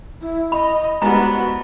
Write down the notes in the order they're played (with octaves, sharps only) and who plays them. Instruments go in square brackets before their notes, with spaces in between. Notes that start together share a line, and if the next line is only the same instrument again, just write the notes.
[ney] E4
[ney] D#5 [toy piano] B5
[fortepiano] G#2 G3 [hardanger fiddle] B3 B5 [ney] F#4 [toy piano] A#5